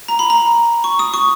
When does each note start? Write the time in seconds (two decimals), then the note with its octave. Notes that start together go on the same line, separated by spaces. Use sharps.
0.08 A#5
0.19 B5
0.30 A#5
0.84 C#6
0.99 D#6
1.14 C#6